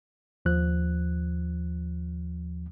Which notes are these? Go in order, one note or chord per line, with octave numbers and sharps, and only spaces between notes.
D#2 F3 F#6